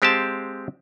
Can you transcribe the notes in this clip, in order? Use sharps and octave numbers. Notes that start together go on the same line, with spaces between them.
G#3 C4 G4 F5 A5